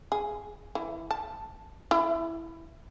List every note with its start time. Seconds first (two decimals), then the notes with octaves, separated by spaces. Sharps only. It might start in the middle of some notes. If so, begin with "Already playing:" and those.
0.12 G#4
0.75 E3
1.11 A5
1.91 E4